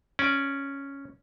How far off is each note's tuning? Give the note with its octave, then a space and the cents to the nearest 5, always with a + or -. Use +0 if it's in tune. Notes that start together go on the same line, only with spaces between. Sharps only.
C#4 +0 D5 +0